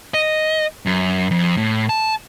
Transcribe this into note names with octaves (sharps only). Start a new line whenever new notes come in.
D#5
F#2
F2
A2
A5